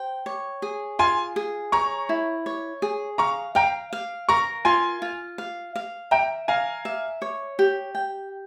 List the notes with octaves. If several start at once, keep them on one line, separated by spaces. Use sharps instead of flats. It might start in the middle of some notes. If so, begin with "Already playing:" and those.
Already playing: C5 G5
C#5
G#4
F4 G#5 C6
G#4
C#5 A#5 C#6
E4
C#5
G#4
F5 A#5 C#6
F5 G5 A#5
F5
A#4 A#5 C#6
F4 G#5 C6
F4
F5
F5
E5 G5 A#5
F5 G#5 A#5
E5
C#5
G4
G5